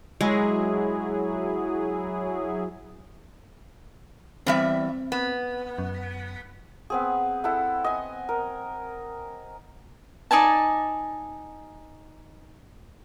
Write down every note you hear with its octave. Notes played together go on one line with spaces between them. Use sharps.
F#3 G#3 E4 G#4
E2 G3 C4 E5
B3
F#2
B3 C4 G#4
E4 A4 F#5
D#5 G#5
A#4
D#4 D5 G#5 A5